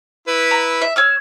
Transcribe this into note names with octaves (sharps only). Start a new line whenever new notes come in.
E4 B4
A#5
E5
C#5 E6 F6